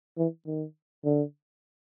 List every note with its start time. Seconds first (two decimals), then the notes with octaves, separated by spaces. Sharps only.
0.18 E3
0.46 D#3
1.04 D3